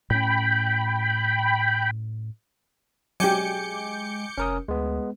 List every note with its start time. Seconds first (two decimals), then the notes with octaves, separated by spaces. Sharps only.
0.10 A2 C#4 G5 B5
3.20 F#3 G#3 G4 G5 G#5 D6 G6 C#7
4.38 F1 C#4 A#4 D#6
4.68 D2 G#3 B3